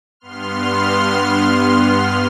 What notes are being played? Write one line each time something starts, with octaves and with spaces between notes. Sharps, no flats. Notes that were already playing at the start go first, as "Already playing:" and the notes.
G2 B3 C6 F6